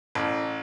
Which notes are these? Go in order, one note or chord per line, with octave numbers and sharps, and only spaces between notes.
A1